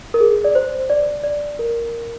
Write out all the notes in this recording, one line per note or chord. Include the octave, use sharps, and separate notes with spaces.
A#4
G#4
D5
C5
D5
D5
A#4